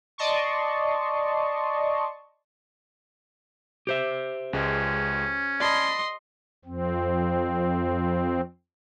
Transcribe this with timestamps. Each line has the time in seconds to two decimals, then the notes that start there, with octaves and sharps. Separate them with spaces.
0.18 D5 D#5 A5 C6 C#6
3.87 G4 C5 E5
4.53 C#2 G#3 C#4
5.60 D5 D#5 A5 B5 C6
6.65 F2 C4